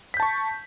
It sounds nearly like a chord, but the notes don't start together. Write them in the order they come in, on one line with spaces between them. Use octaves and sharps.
B6 G6 A5 C#6